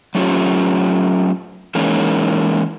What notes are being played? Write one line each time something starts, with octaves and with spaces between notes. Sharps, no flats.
F#3 A3 C#4 F4 G4
E3 G#3 A#3 C#4 D#4